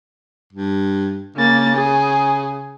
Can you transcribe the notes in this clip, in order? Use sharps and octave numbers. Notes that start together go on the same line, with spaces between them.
G2
C#3 A#3 A6
G#4